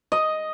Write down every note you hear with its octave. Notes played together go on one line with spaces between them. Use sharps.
D#5